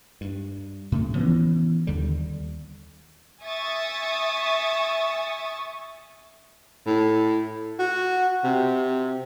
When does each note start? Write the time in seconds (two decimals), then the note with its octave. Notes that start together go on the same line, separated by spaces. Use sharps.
0.21 G2
0.92 A2 C#3 A3
1.15 E3 F3 B3 C#4
1.87 D#2 D3 G3
3.44 E5 G#5 C#6 D#6 A6
6.86 A2
7.79 F#4
8.44 C3